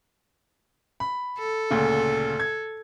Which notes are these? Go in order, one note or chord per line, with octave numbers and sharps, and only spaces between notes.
B5
A4
D2 A#2 C#3
G#6